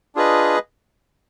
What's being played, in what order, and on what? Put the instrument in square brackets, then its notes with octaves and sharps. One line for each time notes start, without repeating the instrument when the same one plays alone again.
[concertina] D4 F4 G#4 B4 D#5